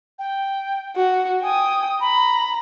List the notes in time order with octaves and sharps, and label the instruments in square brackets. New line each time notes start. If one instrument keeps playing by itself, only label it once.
[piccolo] G5
[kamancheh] F#4
[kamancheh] G5 D#6 [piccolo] G#5
[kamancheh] A#5 [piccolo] B5